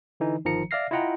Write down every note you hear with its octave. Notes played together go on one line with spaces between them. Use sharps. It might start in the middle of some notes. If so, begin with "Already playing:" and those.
D3 E3 D#4
G1 D#3 F3 A#5 C#7
D5 E5 F5 F6 A#6 C7
E4 F4 D#5 F#5 G5 A#5